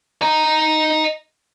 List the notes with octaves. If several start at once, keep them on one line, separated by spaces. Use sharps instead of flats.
D#5 A#5